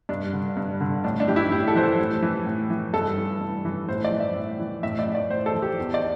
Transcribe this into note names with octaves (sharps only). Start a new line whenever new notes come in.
G2 D4
D3
G2
D3
A2 D4
D4
E3 G4
E4
A2 G4
A4
E3 C5
A4
A2
E3
A2
E3
G2 A4
E3
G2
E3
A2 C5
D5
E3
E5
A2
E3
A2 E5
D5
E3
D5
A2 C5
A4
E3
G4
E2
D5